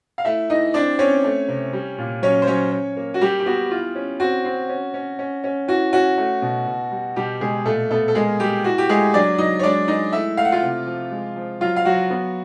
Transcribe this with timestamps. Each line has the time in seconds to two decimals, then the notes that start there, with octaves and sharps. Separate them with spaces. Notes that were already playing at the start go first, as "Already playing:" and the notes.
0.18 F5
0.25 A3 E4 E5
0.50 E3 D#4 D#5
0.74 C4 D4 D5
0.99 C4 C#4 C#5
1.24 A3
1.48 C3
1.73 G3
1.98 A#2
2.22 F#3 C#4 C#5
2.42 C5
2.47 F#3 C#4 C#5
2.72 C#4
2.97 A#3
3.14 F#4
3.21 G3 G4
3.40 G4
3.46 B3 F#4
3.71 E3 F4
3.95 C#4
4.20 C4 F#4
4.45 C4
4.69 C#4
4.94 C#4
5.19 C#4
5.44 C#4
5.68 E3 F#4
5.93 C#4 F#4
6.18 A3
6.42 B2
6.67 B2
6.91 G3
7.16 B2 G3 G4
7.41 B2 G#3 G#4
7.66 A#2 A3 A4
7.90 A3 B3 A4
8.08 A4
8.15 G#3 A#3 G#4
8.40 G3 G4
8.64 E3 F#4
8.78 G4
8.89 G#3 A3 G#4
9.14 F#3 D4 D5
9.38 F#3 D#4 D#5
9.59 C#5
9.63 G#3 D4 D5
9.88 G#3 D#4 D#5
10.12 A3 E4 E5
10.37 A3 F5
10.45 F#5
10.52 F4 F5
10.62 C3
10.87 F3
11.11 G#3
11.36 F3
11.61 F#3 F4 F5
11.76 F5
11.85 F#3 F#4 F#5
12.10 B3